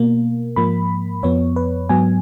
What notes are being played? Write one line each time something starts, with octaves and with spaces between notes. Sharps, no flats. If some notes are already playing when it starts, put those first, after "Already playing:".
Already playing: B2 A#3
G#2 F3 A#3 B5
F2 F3 B3 C#5
B4
G#2 F#3 B3 G#5